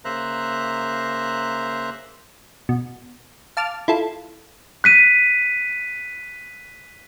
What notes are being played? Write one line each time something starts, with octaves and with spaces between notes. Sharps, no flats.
C#3 A#3 C5 E5 A#5 F#6
B2
F5 A5 D6 F6
E4 F4 A4
F#6 B6 D#7